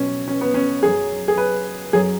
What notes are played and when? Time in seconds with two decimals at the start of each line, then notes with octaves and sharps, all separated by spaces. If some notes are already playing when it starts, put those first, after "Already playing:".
Already playing: B2 F#3 C#4
0.28 C#4
0.41 B3
0.54 C#4
0.83 F#2 F#3 G#4
1.28 G#4
1.38 B4
1.93 F#2 F#3 G#4